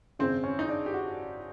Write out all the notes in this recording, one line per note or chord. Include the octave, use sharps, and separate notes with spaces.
G#1 F#2 C#3 C4
C#4
D#4
D4
G4
F#4